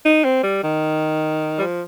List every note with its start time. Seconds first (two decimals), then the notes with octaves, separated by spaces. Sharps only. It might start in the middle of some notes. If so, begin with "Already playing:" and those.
0.05 D#4
0.24 C4
0.43 G3
0.63 D#3
1.58 G3
1.61 F3